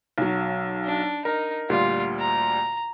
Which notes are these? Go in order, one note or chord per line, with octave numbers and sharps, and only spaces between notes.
B1 F#3
D4
D#4 A#4
D2 A#2 G3 F4
A#5